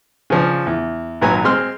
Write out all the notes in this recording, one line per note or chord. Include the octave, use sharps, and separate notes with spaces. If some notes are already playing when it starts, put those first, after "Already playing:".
C#3 F3 D4
E2
G#1 A#2 F#3 B4 G#5 A#5
G#3 C4 C6 F6